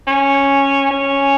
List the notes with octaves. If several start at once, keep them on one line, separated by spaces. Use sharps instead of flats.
C#4
C#4